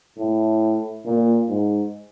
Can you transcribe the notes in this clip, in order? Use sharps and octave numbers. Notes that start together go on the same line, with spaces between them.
A2
A#2
G#2